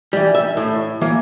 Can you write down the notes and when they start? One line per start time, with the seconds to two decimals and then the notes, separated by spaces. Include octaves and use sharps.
0.13 E3 G3
0.35 E5
0.57 A2
1.02 E3 A#3